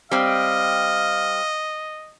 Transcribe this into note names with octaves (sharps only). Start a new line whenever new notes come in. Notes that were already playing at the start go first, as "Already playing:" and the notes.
G3 C4 D#5 F5